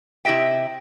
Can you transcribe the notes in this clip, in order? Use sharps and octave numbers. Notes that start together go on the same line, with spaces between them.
C3 E4 G4 D#5 E5 G5